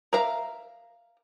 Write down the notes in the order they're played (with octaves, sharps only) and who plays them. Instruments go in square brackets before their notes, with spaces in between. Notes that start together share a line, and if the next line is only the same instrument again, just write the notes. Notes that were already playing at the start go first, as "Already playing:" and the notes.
[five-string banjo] A#4 E5 F5 A#5